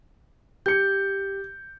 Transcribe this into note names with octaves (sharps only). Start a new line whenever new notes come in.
G4 G6 C#7